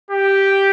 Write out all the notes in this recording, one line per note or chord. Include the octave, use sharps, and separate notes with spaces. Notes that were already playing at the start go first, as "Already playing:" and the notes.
G4